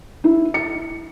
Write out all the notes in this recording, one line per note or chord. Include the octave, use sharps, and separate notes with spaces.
E4
C#7